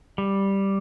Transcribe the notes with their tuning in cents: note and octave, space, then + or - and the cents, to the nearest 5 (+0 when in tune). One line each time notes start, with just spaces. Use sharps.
G3 +0